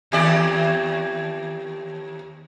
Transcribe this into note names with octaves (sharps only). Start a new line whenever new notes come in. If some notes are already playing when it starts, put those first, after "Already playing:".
D#2 G4 D5